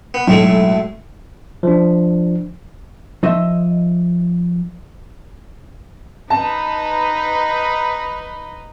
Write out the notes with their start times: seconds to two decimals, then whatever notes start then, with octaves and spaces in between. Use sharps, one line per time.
0.14 B3
0.28 B1 A2 G#3 A3
1.63 F3 D4
3.23 F3 D#4 D#5 E5
6.30 D#4 B4 A5